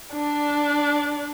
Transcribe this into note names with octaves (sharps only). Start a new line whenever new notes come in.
D4 D5